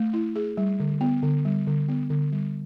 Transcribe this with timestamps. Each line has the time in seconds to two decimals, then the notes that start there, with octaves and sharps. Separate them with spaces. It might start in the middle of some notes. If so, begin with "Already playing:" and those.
Already playing: A3
0.13 E4
0.36 G#4
0.57 G3
0.80 D3
1.01 B3
1.22 D3
1.45 G3
1.67 D3
1.88 B3
2.10 D3
2.32 G3